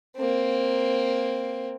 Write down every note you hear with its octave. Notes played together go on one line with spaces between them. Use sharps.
A#3 C4